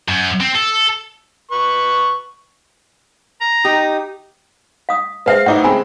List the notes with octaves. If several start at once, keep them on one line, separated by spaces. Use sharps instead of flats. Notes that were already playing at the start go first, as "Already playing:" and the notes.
F#2
C4
A4
B4 C#6
A#5
D#4 G4 D#6
F5 D#6
G#3 B4 C5 E5 F5
A2 D#4 E4 F#5 D6
C#3 G#3 C4 G#5 B5